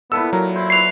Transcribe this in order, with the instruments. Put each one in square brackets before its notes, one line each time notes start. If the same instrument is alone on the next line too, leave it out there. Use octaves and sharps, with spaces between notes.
[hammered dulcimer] A#2 E4 A4 [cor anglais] B3 [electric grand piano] E6
[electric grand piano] F#3 [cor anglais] A#4
[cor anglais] E4 [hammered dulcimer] C5
[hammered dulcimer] B4 C#5 [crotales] C7 F7